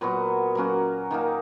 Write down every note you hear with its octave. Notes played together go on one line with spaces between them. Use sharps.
A#2 F#3 B3 F#4
F#3 A#3 C#4 F#4
D#3 A#3 D#4